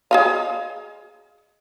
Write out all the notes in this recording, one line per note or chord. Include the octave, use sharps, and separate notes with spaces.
G#4 D#5 F5